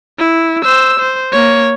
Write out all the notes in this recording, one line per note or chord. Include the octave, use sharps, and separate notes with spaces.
E4
C5 E6
C5
A#3 C#5